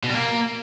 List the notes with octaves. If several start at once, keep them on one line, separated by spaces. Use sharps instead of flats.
B2
G3
A#3